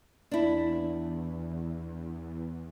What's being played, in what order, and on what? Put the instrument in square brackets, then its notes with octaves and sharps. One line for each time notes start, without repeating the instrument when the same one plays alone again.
[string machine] E2 [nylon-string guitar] D4 E4